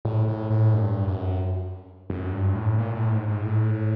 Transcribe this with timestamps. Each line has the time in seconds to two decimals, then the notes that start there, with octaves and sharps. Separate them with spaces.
0.05 A2
0.28 A2
0.50 A2
0.74 G2
1.07 F#2
2.10 F#2
2.32 G2
2.55 A2
2.78 A#2
2.95 A2
3.12 G#2
3.28 G#2
3.45 A2